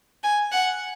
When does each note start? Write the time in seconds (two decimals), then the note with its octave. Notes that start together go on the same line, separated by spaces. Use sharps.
0.23 G#5
0.52 F#5